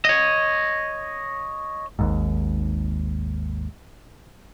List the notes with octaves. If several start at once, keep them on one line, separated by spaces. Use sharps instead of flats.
C#5 D#5
G#1 D#2 G#2